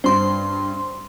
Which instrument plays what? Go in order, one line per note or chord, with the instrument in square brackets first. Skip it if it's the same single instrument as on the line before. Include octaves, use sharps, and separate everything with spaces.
[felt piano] G2 [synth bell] C5 C6